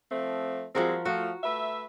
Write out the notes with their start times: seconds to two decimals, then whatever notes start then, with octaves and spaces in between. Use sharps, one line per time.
0.11 F3 A3 C4
0.75 F3 G3 G#3 C4 F#4 A#4
1.05 F3 A3 F#4
1.43 A3 B4 E5